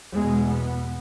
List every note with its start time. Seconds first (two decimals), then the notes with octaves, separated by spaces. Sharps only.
0.14 E2 B2 G#3
0.49 B3